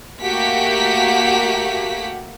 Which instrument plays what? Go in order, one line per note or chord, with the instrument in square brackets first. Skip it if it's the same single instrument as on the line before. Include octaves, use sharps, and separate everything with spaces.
[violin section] A3 A#3 F#4 G4 F#5 B6